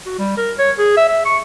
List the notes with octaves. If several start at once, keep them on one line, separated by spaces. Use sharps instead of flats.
F#4
G3
A#4
C#5
G#4
E5
E5
C#6